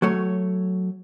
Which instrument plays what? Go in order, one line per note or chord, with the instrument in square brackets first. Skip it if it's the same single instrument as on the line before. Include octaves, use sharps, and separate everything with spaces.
[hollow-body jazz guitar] F#3 A3 C#5